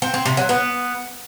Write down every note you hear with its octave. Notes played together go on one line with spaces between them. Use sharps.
C4
C4
C3
F#3
B3